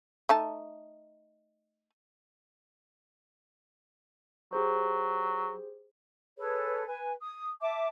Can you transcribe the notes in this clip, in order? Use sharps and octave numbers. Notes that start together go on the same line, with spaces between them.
A3 D#4 A5
F#3 G4 G#4 C5
G#4 A4 B4 C#5
B4 G#5
D#6
E5 A5 D6